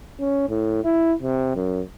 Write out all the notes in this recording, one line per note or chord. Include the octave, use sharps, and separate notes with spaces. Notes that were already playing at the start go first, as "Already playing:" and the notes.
C#4
A2
E4
C3
F#2